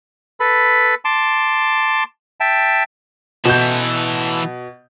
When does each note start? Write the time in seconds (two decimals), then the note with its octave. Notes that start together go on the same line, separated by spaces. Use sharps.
0.40 A4 B4 B5
1.05 A5 C6 D6
2.40 E5 G5 A5
3.45 B2 E3 A4 G6